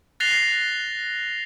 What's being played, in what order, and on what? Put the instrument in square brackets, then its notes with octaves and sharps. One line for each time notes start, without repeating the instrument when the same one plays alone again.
[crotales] F#6 A6 A#6 C7 F7 G7